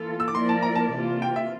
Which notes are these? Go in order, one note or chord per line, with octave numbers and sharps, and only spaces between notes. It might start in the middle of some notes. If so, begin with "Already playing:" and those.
Already playing: E3 A#3 F4 A4
E6
D6
F3 A#3 E4 A#4 D5 C6
A5
A#5
A5
C3 E3 A#3 F4
G5
E5